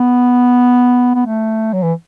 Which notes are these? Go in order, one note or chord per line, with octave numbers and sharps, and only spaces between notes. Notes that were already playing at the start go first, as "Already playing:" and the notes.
Already playing: B3
B3
A3
F#3
E3